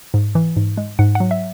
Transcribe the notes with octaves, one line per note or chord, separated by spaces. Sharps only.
G#2
E3
G#2
G#3
G#2 F#5
F#5
F#3
E5